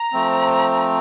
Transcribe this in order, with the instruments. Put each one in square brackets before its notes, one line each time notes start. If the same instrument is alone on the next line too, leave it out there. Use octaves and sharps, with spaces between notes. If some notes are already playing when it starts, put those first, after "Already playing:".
Already playing: [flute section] A#5
[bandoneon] F3 A3 C4